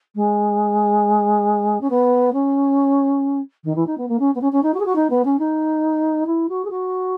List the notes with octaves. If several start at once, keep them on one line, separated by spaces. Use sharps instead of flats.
G#3
C#4
B3
C#4
D#3
E3
D#4
B3
A#3
C#4
B3
C#4
C#4
D#4
F#4
G#4
F#4
D#4
B3
C#4
D#4
E4
F#4
G#4
F#4